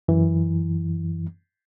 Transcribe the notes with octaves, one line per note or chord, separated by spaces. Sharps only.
F#2 E3